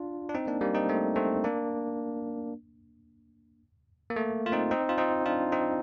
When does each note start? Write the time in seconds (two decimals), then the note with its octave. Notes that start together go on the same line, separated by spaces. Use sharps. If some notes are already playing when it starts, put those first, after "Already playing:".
Already playing: D4 F4
0.29 D4
0.35 C4 D#4
0.47 A#3 D4
0.61 G3 A#3
0.75 C4 D#4
0.89 A3 C4
1.16 A3 C4
1.44 A#3 D4
4.10 A#3
4.16 A3
4.46 F4
4.52 C4 D#4
4.71 C4 D#4
4.89 F4
4.98 C4 D#4
5.26 D4 F4
5.52 C4 D#4